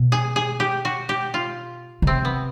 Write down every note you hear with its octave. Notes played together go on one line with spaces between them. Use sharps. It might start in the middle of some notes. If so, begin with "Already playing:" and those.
Already playing: B2
G#4
G#4
G4
F#4
G4
F4
C#3
C3 C4
B3